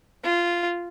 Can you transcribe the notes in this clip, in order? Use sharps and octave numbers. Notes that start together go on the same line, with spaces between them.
F4